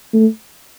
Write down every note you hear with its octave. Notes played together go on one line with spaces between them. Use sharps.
A3